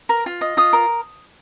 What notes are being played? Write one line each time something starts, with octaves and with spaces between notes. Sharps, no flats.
A#4
F4
D#5
F4 D#6
A#4